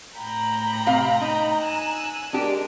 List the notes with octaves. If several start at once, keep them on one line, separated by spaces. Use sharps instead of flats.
A2 G5 A#5 B5
C3 F5
D#4
G#5 E6 F#6
G#3 D4 G4 A#4